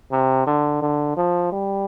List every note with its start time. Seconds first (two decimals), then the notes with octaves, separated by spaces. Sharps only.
0.12 C3
0.47 D3
0.82 D3
1.17 F3
1.52 G3